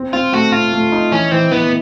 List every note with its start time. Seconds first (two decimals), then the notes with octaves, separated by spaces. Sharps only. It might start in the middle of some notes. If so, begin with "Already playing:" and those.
Already playing: C4
0.13 C4 F4
0.32 A3 F#4
0.52 C4 F4
0.73 A3
0.92 D#4
1.12 E3 C#4
1.31 E3 C4
1.51 E3 B3